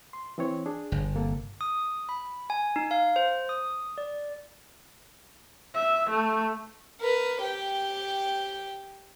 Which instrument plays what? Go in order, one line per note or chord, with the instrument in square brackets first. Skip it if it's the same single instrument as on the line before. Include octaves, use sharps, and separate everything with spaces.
[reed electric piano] C6
E3 C4 C#5
D4 G#4
[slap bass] G1
[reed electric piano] C3 A#3 A4
[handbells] D#6
B5
G#5
D#4
F5
C5
D#6
D5
[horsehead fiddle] E5
A3
[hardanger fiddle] A#4 B4
G4 G5